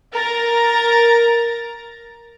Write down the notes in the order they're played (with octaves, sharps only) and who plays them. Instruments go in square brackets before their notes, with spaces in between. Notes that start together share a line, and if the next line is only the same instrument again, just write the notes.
[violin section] A#4 A#5 A6